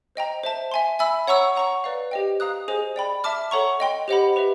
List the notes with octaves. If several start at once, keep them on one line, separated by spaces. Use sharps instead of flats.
C5 D#5 G5 A#5
C5 E5 A5
E5 G#5 C6
E5 G#5 B5 E6
C#5 F#5 A#5 C#6 E6
C#5 F#5 A#5 C#6
B4 D5 F5 A#5
G4 C5 D#5 G5
F5 A#5 D#6 F#6
G#4 C5 D#5 G#5
D5 G5 B5
E5 A5 D6 F6
A4 C#5 F#5 A#5 C#6
D#5 G5 C6
G4 C5 D#5 F#5 B5
G4 B4 E5